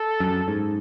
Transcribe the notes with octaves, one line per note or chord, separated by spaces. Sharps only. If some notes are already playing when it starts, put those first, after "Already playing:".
Already playing: A4
F#2
G#2